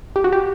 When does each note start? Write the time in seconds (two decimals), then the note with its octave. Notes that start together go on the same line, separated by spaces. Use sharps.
0.16 G4
0.24 F#4
0.33 G4